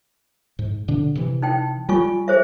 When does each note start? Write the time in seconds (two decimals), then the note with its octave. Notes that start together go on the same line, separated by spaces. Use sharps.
0.59 G#2
0.88 B2 D3 D4
1.15 C3 E3
1.42 D#4 G5
1.89 G3 F4 G#5 C#6
2.28 G#4 C5 E5